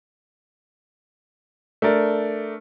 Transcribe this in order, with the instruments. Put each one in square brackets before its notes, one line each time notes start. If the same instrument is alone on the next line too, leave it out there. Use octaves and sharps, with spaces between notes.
[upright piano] A3 D4 A#4 D5